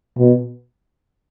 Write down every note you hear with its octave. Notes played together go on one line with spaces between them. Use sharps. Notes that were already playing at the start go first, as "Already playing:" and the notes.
B2